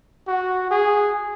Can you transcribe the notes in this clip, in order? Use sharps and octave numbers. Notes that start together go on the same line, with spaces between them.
F#4
G#4